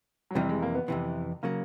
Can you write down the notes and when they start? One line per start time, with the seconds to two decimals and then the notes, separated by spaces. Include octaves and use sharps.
0.31 F#3
0.35 F2 C3 E3 G3
0.49 G#3
0.62 A#3
0.75 B3
0.88 F2 C3 E3
1.43 C#3 F#3 A#3